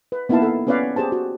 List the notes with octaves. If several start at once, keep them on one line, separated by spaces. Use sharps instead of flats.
B4
A#3 B3 D#4 E4 F5 A5
A4 F5
B3 C#4 B4 C#5 D5 F5
G4 G#4 C5 A5
F#4